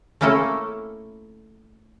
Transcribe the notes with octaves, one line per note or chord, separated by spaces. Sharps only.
A3 A#3 C#4 E4 A4